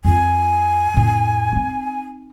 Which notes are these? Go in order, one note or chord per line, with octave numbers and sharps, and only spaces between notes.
F2 F4 G#5
F2 A2
C4 D#4